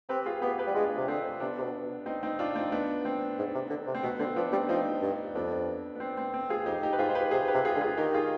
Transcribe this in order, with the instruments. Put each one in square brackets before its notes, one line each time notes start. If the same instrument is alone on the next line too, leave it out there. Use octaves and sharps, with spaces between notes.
[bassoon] C4 [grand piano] G4 B4
[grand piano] F4 G#4
[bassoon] B3 [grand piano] G4 B4
[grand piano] G4 B4
[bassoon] G3
[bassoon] G#3 [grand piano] D4 F4
[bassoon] C3
[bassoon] D3 [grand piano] C4
[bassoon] C3 [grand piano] B3 D4
[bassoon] C3
B2
[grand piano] C4 D#4
C4 D#4
D4 F4
C4 D#4
B3 D4
C4
[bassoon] G#2
C3
D3
C3
[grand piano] C4
[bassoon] B2 [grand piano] B3
[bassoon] D3 [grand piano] C4
[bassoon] F3 [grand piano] B3 D4
[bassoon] G3 [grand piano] C4 D#4
[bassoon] F3 [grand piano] C4 D#4
[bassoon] G2
[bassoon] F2 [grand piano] B3 D4
[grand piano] B3
C4
C4
C4
F4 G#4
[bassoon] F2 [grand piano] D#4 G4
[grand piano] D#4 G4
B4
[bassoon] G#2 [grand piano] F4 G#4
[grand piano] C5
G4 B4
[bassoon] C3 [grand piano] G#4 C5
[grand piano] G4 B4
[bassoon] C3
[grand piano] F4 G#4
[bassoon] D3
[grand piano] F4 G#4
[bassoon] D#3 [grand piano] D#4 G4
[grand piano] F4 G#4